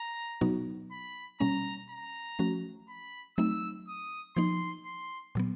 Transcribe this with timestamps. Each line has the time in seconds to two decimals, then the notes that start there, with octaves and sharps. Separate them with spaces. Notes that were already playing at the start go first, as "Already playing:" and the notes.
Already playing: A#5
0.41 B2 F#3 B3 D#4 F#4
0.91 B5
1.40 B2 G3 A#3 C#4 A#5
1.90 A#5
2.39 F3 A3 C#4 F#4
2.89 B5
3.37 F#3 A3 C4 D#4 E6
3.88 D#6
4.36 F3 A#3 D#4 C6
4.86 C6
5.35 A#2 F#3 B3